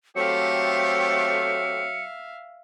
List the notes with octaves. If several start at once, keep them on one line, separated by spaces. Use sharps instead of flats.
F#3 A3 C4 G4 E5 F5 C#7